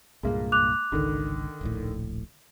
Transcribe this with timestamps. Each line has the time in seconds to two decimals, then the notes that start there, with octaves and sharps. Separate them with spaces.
0.23 C2 G2 A#2 G#3 A#3
0.52 D6 F#6 F7
0.92 G#1 C#2 D3 D#3
1.61 D1 A#1 A2